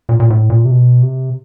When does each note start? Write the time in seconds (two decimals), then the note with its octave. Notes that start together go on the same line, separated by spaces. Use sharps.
0.09 A#2
0.20 A#2
0.30 A2
0.50 A#2
0.65 C3
0.71 B2
1.02 C3